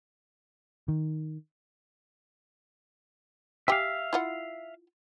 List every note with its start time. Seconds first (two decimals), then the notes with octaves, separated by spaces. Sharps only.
0.88 D#3
3.68 G4 E5 F5 G5 G#5
4.13 E4 F4 F#5